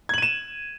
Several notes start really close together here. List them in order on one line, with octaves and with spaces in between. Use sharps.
G#6 F#7 D#7 E7